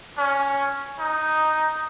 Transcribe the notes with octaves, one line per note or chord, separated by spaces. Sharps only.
C#4
D#4